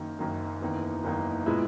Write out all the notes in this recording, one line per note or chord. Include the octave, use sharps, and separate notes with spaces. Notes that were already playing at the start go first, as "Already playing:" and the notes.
Already playing: F#1 F#2 D#3 A#3
F#1 F#2 D#3 A#3
F#1 E2 D#3 A#3
F#1 E2 D#3 A#3
A#2 G#3 B3 E4